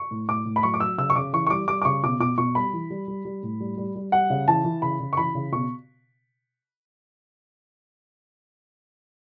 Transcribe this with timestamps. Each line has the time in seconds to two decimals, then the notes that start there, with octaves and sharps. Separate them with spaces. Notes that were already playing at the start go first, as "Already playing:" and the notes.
Already playing: C#6
0.11 A2
0.28 A2 D6
0.46 A2
0.56 B5
0.63 F#3 C#6
0.74 D6
0.80 F#3 E6
0.98 C#3 E6
1.10 C#6
1.16 C#3 D6
1.33 E3 C#6
1.47 C#6
1.50 G3 D6
1.68 G3 D6
1.82 D6
1.85 C#3 C#6
2.03 B2 D6
2.20 B2 D6
2.38 B2 C#6
2.55 G3 B5
2.73 E3
2.90 G3
3.08 G3
3.25 G3
3.43 A2
3.60 G3
3.77 G3
3.95 G3
4.12 G3 F#5
4.30 C#3
4.47 E3 A5
4.64 E3
4.82 C#3 B5
5.00 C#3
5.13 C#6
5.17 E3 B5
5.35 C#3
5.52 B2 C#6